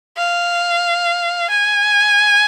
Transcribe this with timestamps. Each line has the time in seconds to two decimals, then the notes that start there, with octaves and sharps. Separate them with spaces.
0.17 F5
1.49 G#5